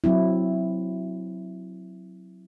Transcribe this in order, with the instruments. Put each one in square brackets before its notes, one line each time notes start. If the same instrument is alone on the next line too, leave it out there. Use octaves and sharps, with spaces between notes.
[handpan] F#3 C4 E4